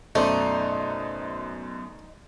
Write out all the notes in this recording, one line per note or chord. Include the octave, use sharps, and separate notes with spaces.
F#2 B2 A3 D#4 C5 D5